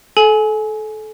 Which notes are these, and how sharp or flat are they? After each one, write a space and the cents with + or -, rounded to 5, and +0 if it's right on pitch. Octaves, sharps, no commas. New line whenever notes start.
A4 -25 G#5 +20